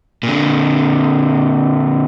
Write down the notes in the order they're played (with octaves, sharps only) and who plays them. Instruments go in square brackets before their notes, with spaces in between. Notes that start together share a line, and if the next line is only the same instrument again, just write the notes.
[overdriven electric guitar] A#2 D3